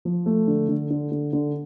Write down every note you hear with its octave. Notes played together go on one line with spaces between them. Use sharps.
F3
A3
D3
D3
D3
D3
D3